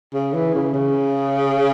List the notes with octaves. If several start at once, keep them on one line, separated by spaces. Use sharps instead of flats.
C#3
E3
C#3
C#3